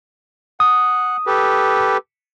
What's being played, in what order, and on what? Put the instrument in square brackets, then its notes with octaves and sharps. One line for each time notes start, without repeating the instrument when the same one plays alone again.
[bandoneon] F#5 [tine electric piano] D#6
[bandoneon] G4 A4 B4